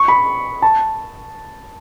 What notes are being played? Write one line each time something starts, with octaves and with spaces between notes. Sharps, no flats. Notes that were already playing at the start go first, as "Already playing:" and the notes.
Already playing: C#6
B5
A5